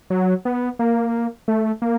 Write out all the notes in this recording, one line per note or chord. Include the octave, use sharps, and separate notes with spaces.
F#3
B3
A#3
A3
A#3